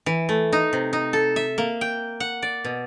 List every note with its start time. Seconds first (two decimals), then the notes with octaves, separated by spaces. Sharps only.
0.06 E3
0.29 A3
0.53 D#4
0.73 C3
0.93 D#4
1.13 A4
1.36 E5
1.58 A#3
1.81 G5
2.20 F#5
2.42 D5
2.64 B2